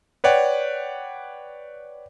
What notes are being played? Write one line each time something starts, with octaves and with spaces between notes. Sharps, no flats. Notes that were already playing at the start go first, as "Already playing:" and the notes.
B4 C#5 D5 F#5 G5